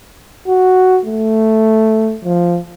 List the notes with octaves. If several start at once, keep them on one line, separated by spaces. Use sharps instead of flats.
F#4
A3
F3